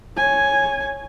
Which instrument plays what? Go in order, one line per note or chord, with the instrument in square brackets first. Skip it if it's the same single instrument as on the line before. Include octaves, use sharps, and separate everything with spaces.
[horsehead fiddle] C#5 G#5